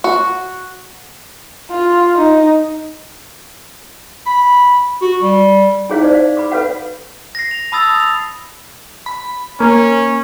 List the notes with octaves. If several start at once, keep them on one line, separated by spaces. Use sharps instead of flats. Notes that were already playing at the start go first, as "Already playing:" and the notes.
F#4
F4
D#4
B5
F#4
G3
D#4 E4 G#4 C#5 D#5 F5
D#4 C5 D5
F5
B5 D6
A4 B4 C#5 F5 F#5 B5
A#6 C7
F7
A5 B5 D#6 E6 A6 F7
F7
B5
A#3 C#4